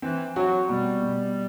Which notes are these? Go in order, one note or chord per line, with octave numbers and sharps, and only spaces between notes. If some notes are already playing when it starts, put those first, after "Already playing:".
E3 C4
F#3 F#4
B2 G3
B2